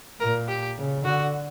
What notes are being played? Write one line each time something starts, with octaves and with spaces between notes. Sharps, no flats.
A#2 A#4
G4
C#3
D3 F#4